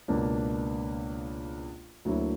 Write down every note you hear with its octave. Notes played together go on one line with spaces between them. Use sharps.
C#2 B2 A#3 D4
D2 D3 F#3 A#3 E4